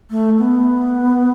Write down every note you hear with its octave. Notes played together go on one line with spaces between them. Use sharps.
A3
B3